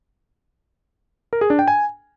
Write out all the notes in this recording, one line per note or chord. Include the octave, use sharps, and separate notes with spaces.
A#4
G#4
D4
G5
G#5